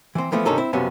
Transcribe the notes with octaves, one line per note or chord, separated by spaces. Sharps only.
E3 C4
E3 F3 A3 B3
G2 C3 D#3 C#4 A4 A#5
C4 E4
F#2 C3 F3 B3 C#4